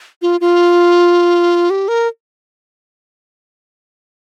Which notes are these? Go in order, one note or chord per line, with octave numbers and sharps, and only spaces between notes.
F4
F4
G4
A#4